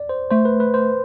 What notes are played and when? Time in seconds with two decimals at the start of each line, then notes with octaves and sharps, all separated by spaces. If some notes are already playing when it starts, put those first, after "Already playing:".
Already playing: D5
0.09 C5
0.30 A3 C5
0.45 B4
0.60 B4
0.74 C5